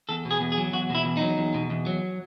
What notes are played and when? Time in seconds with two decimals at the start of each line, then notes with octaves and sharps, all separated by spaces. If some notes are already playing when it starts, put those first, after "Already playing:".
0.09 E2 A4
0.25 B2
0.31 G#4
0.41 E2
0.52 G#4
0.57 F#3
0.73 E2 F#4
0.90 B2 E4
1.05 E2
1.17 F#3 D#4
1.38 E2
1.54 B2
1.70 E2
1.86 F#3